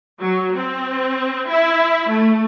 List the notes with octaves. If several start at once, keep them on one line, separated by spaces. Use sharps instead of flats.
F#3
C4
E4
A3